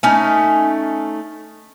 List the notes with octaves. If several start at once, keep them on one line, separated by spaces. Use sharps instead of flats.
A3 C#4 D#4